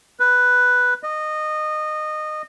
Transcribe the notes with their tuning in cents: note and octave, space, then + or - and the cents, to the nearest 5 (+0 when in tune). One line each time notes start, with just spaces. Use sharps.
B4 +0
D#5 -20